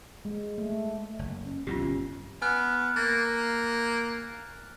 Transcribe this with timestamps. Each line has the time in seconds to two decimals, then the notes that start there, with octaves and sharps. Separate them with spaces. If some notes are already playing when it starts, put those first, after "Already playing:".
0.25 G#3
0.58 A3
1.19 F#1
1.44 C#4
1.67 B1 E2 C3 C#4 F4 G4
1.82 G1
2.42 B3 G#5 F6 F#6
2.96 A#3 A6